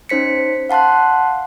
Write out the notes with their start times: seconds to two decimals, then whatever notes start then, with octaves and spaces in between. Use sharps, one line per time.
0.09 C#4 D#4 C5 B6 C#7
0.70 F5 F#5 A5 C6 F#6